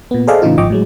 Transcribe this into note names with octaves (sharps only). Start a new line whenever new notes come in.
A#2 B3
G#4 A4 C5 D5 D#5 F5
A2 C#3 E3 D#4 F4
G#1 F3 D#5 G5 C#6 D6
A2 F#3 G#3